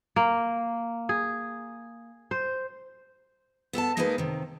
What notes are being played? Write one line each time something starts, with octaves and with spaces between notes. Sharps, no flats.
A#3
G#4
C5
B3 A4 G5 A5
G#3 A#3 D#4 G#4 A#4 B4
C3 D#3